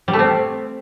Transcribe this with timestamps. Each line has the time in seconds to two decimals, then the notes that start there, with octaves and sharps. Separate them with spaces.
0.08 G3
0.13 A3
0.19 C4